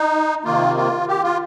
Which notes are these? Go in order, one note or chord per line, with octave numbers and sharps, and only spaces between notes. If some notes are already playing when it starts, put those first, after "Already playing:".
Already playing: D#4
C3 D#3 A#3 F4
F4
G4
F4